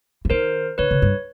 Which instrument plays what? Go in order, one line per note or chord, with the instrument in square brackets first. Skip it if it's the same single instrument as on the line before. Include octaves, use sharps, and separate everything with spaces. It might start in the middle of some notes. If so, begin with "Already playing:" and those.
[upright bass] E3
[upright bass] D#3 [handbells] A#4 C5
[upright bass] D3 [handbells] B4 C#5
[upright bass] C#3
G2